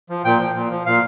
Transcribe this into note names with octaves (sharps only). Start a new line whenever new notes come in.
F3
A#2 G5
F3
A#2
F3
A#2 F5